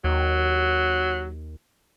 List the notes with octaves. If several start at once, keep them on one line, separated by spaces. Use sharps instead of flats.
D#2 F#3